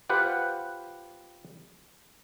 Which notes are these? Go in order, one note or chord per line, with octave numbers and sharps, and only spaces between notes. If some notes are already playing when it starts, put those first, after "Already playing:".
F4 G4 B4 C5 F#5